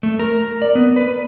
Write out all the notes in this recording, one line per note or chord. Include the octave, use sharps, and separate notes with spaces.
A3
A#4
D5
B3
B4